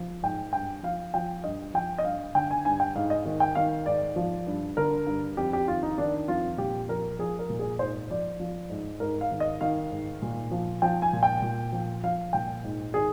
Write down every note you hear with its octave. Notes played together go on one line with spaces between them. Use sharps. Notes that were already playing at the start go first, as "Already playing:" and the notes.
Already playing: F3
G#2 G5
G2 G5
F3 F5
F3 G5
G2 D#5
F3 G5
D#5
G2 F5
D3 G5
G#5
G2 G#5
G5
G#2 F5
D#5
D#3
G5
D#3 F5
G#2 D5
F3
G2
D3 A#4
G2
F2 G4
G4
D#3 F4
D#4
D#3 D4
F2 F4
A#2 G4
F3 A#4
F3 G#4
A#4
A#2
G#4
G#2 C5
F3 D5
F3
G#2
G#2 A#4
F5
D#3
D#5
D#3 F5
G#2
A#2
F3
F3 G5
G#5
A#2
G5
A#2
F3
F3 F5
A#2 G5
G#2
D#3 G#4